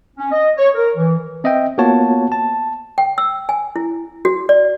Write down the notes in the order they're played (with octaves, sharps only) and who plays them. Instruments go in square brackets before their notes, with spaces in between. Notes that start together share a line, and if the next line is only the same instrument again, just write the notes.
[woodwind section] C#4
D#5
C#5
A#4
E3
[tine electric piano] C4 D#5 E5 G5
A#3 B3 F4 F#4 C#5 A5
A5
[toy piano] G5
E6
G#5
E4
F#4
D5